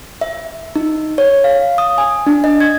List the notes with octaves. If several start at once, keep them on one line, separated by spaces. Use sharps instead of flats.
E5
D#4
C#5
F5
D#6
G#5
D4
D#5
G#6